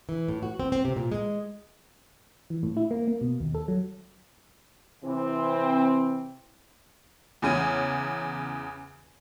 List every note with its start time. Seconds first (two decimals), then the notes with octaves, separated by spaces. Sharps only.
0.09 E3
0.28 A2
0.43 F#4
0.60 C4
0.72 C4
0.85 C3
0.96 A#2
1.12 G#3
2.50 E3
2.63 A2
2.77 E4
2.91 A#3
3.08 A#3
3.21 B2
3.40 D#2
3.55 A4
3.68 F#3
5.04 C3 E3 C4
7.42 E2 C#3 C#4 D#7